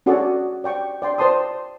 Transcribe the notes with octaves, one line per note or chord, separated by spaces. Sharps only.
C#4 F#4 G#4 A4 D5
D5 G5 C#6
D5 G5 C6
C5 D5 A5 C6 D#6